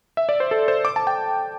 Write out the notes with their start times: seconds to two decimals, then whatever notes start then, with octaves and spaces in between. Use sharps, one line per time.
0.17 E5
0.29 D5
0.40 C5
0.51 A4
0.68 C5
0.85 D6
0.96 A5
1.07 G5